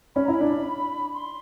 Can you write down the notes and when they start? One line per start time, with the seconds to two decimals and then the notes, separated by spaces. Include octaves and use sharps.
0.15 C#4 B5
0.25 E4 A#5
0.33 B5
0.41 D4
1.14 C6